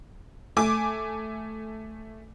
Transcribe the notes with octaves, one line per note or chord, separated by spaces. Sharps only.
A3 G#5 D6